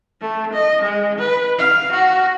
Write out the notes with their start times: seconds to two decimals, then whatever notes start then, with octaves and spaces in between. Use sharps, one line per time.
0.21 A3
0.53 D#5
0.82 G#3
1.18 B4
1.58 F5
1.92 F#4